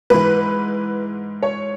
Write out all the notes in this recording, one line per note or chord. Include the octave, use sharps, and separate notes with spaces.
G#2 E3 B4
C#5